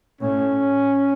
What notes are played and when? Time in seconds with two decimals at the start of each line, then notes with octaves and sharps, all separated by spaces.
0.20 A2 C#4